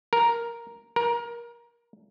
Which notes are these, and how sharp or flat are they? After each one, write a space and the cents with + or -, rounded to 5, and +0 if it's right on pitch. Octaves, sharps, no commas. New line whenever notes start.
A#4 +5
A#4 +25